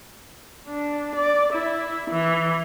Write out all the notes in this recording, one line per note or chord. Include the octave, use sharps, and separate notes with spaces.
D4
D5
E4
E3